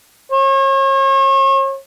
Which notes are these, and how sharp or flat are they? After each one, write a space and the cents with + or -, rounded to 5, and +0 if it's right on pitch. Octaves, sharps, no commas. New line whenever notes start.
C#5 -40